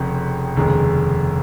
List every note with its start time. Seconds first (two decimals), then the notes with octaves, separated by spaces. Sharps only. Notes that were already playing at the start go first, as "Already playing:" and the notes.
Already playing: F1 F2 C#3
0.56 F1 D#2 C#3 G#3